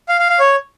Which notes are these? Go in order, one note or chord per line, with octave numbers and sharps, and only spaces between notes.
F5
F5
F5
C#5